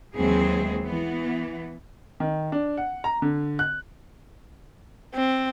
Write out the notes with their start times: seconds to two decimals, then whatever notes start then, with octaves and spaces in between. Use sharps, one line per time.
0.16 D#2 E3 F#3 G#3 C4 G#4
0.84 E3 B3
2.20 D#3
2.52 D4
2.77 F#5
3.04 A#5
3.22 D3
3.59 F#6
5.14 C4